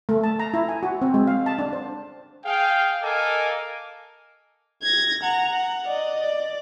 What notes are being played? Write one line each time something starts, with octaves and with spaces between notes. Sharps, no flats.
A3
A5
A#5
E4
G#5
F#4
C4
G#3
F5
A5
D4
C5
G#4 F5 G5
A4 A#4 D#5 F5 G#5 D6
G#6 A#6
F#5 A#5
F#5
D5 D#5
D5